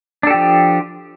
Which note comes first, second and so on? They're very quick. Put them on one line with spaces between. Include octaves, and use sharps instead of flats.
D4 A4 G4 F3